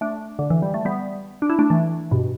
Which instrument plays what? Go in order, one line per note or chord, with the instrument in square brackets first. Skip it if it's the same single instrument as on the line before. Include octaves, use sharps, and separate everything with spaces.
[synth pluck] A3 D4
D3
E3
G3
A3
G3 B3
D4
E4
A3 D4
E3 A3
G2 B2